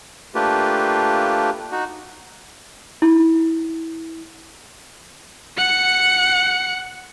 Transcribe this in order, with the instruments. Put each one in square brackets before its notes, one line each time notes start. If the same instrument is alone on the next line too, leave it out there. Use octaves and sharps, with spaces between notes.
[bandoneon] A3 A#3 D4 F4 G4 B4
D#4 F#4
[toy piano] E4
[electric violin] F#5 C#7